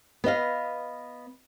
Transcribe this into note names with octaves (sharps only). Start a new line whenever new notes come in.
B3 B4 D#5 F5